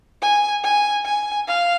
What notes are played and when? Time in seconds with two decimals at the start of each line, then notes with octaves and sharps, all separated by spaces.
0.22 G#5
0.64 G#5
1.05 G#5
1.48 F5